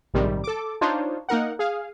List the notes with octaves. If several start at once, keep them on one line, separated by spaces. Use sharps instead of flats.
A#1 G#2 C3 D#3 G3
A4 D6
D4 D#4 F4 C5 C#5
A#3 D#4 A#4 F#5
G#4 F5